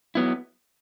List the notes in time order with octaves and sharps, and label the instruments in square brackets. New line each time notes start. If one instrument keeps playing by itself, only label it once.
[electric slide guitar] F#3 B3 E4